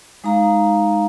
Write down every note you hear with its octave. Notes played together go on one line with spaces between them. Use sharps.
G#3 D#4 F5 A#5